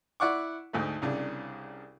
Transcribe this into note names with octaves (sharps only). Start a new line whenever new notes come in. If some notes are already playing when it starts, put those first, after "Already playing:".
E4 D5 F#5 C#6 D6
D2 G#2 A3
C2 C#3 D4